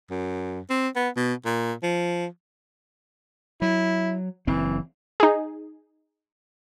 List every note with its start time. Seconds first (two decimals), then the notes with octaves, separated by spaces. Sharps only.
0.10 F#2
0.70 C4
0.95 B3
1.16 B2
1.45 A#2
1.83 F3
3.62 F#3 E4
4.47 F#1 E3 C4
5.20 D#4 G#4